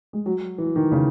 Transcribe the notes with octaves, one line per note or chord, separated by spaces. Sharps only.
G#3
F#3
E3
D#3
C#3